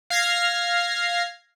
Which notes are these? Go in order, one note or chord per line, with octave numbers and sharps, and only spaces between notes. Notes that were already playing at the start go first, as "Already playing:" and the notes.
F5 F6 G#6 A#6 C7